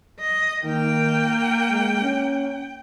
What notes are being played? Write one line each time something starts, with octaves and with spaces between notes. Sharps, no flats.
D#5
D#3 A#3 G5
G#3
C#4